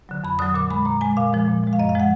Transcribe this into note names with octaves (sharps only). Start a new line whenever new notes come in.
D3 F#3
F2 B5
D3 F#3 D#6
A#2 D6
G#3 B5
A#2 A#5
G#3 G#5
A#2 F5
F3 G#3
A#2
F3 G#3
F5
F#2 D#5
F5
F3 G#3 F#5